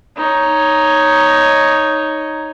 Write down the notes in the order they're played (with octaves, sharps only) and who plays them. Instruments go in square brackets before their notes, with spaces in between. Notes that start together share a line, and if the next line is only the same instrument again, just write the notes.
[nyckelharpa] D#4 C#5